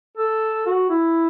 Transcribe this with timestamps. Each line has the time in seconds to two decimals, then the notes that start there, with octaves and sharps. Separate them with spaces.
0.18 A4
0.67 F#4
0.90 E4